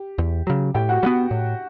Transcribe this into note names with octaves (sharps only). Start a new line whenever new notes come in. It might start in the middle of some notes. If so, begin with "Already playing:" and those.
Already playing: G4
E2
C#3 F#3
A2 G4 G5
F#4 F#5
G3 B3 F#4 F#5
A2